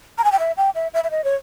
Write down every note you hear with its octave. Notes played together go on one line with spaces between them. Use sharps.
A#5
G#5
G5
E5
G5
E5
E5
E5
D#5
C#5